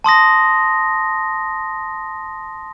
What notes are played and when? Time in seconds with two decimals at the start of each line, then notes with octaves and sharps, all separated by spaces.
0.04 A5 C6 D#6 A#6